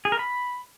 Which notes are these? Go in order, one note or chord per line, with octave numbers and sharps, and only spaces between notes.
G#4
A#4
B5